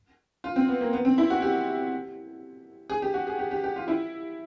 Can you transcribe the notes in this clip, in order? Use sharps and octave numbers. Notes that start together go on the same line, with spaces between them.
F4
C4
B3
A#3
B3
C4
E4
F#4
G4
G#4
G4
F#4
G#4
G4
G4
G4
F4
E4